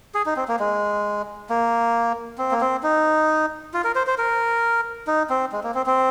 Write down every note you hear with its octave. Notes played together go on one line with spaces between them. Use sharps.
G#4
D#4
C4
A#3
G#3
A#3
C4
A#3
C4
D#4
F4
A#4
C5
C5
A#4
D#4
C4
G#3
A#3
C4
C4